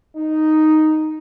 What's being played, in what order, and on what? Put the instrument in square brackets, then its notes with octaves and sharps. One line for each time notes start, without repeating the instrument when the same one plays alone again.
[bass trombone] D#4